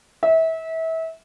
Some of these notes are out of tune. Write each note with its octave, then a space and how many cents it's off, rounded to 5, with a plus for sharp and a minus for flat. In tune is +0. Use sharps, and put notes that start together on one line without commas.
E5 -30